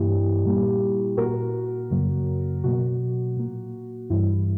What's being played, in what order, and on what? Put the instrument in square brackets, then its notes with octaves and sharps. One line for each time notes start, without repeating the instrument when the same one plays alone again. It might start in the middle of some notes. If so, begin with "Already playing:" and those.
Already playing: [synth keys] G2 E3 A#3 E4 G4
A#2 G3 A#3
A#2 A#3 F#4 A#4
F#2 C#3 F#3 A#3
B2 F#3 A#3 F#4
A#2 A#3
G2 E3 G3 E4